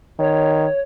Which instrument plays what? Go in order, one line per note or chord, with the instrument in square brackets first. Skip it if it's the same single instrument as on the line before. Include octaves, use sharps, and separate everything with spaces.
[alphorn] D#3 [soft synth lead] C#5